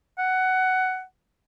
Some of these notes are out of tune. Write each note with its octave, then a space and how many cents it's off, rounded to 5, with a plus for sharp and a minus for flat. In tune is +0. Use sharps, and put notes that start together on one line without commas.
F#5 +15